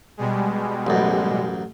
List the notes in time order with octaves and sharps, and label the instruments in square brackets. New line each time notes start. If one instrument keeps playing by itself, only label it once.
[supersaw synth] B2 G3 G#3
[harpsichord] A1 F#2